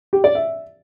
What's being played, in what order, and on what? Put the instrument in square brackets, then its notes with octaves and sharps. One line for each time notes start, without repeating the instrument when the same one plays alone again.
[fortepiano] G4
D5
E5